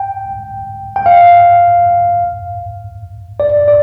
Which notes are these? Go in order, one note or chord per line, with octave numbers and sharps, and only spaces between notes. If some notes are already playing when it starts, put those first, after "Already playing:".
Already playing: G5
G5
F5
D5
D5